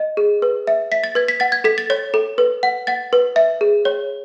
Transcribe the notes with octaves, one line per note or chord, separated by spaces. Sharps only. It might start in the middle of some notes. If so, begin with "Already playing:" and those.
Already playing: D#5
G#4
B4
E5
E5 B6
A6
B4 G#6
B6
F#5 A6
G#6
A4 B6
A6
C#5 A6
A4
B4
F#5
F#5 A6
B4
E5
G#4
C#5